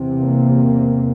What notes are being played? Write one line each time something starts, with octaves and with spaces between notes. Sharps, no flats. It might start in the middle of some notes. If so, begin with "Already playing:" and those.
Already playing: E2 C3
A#3